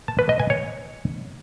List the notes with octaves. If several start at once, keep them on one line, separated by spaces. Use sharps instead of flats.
A5
B4
D#5
G#5
C#5